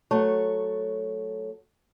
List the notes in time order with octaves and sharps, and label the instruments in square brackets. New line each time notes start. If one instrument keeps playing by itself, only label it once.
[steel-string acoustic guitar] F#3 A3 C#5